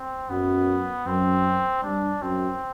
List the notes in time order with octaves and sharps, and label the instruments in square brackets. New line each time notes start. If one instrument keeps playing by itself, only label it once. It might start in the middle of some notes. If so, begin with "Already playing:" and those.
Already playing: [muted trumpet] C4
[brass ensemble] F#2 [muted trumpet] B3
[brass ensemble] F#2 [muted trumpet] C4
[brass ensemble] G2 [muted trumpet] D4
[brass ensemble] F#2 [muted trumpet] C4